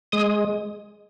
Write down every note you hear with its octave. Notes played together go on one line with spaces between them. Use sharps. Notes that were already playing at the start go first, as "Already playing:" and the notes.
G#3 D#6